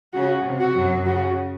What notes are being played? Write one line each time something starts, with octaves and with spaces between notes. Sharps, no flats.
C#3 F#4
C3
F#4
F#2 F#3
C#3 F#4